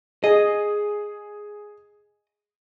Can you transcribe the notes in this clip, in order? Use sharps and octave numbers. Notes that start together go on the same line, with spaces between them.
G#4 D#5